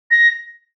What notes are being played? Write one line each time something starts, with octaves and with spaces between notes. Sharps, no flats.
A#6